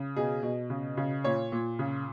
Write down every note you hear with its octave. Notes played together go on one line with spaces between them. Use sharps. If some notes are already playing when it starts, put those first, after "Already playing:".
Already playing: C#3
B2 G#4
B2
C#3
C#3
A#2 C#5
A#2
C#3